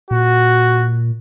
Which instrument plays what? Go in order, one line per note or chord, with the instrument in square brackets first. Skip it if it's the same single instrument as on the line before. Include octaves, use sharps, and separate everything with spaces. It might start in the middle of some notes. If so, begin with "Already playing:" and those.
[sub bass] A#2 [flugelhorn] F#4